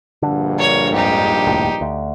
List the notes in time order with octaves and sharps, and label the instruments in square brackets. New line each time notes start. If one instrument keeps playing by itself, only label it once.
[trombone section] A#1 G2 [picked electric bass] D3
[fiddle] A#4 C#5
[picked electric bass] F2 G#2 [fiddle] D#4 G4
[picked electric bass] F1 D#2 A2
D2